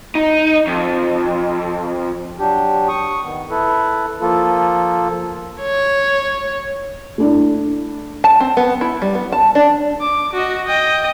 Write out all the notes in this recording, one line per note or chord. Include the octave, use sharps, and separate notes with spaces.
D#4
F2
F#3 D4 G4
C#6 D#6
D#3 B3
E4 A4 B4
F3 A#3 F4 A4
C#5
A3 D4 E4
A5
C4
B3
E4
G3
B3
A5
D4
D6
F#4 D#5
D#5 G5